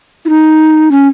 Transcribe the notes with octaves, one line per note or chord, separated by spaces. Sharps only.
E4
D#4
C#4